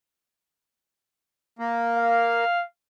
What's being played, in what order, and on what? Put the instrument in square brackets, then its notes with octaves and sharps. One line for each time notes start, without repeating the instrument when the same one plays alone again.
[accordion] A#3
[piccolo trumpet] F5